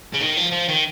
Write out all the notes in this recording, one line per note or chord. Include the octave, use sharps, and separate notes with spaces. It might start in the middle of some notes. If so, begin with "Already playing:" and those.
C#3
D#3
F3
F3
D#3